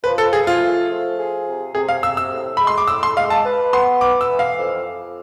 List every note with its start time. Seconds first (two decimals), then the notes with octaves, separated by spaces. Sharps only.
0.04 F3 B4
0.18 A4
0.32 F3 G#4
0.47 F4
0.61 A3
0.89 F3
1.18 G#4
1.47 C3
1.74 C3 G#4
1.88 F5
2.03 C3 E6
2.17 E6
2.31 A2
2.57 G#3 B5
2.67 C6
2.78 D6
2.87 A2 E6
3.03 C6
3.16 G#3 F5
3.30 A5
3.45 B4
3.73 B3 C6
4.01 B4 D6
4.21 E6
4.29 E3
4.39 F5
4.58 F2
4.87 F2